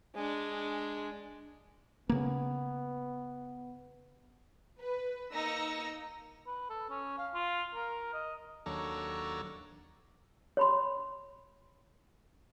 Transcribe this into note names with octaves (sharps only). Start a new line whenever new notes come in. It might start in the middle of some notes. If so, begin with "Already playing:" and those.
G#3 D4
C#3 A#3 B3
B4
A#3 D#4 E6 A#6 C#7
B4
A4
C#4
F5
F4
A#4
D#5
D#2 F#3 D4 A4 C#5 A#5
C#5 B5 C6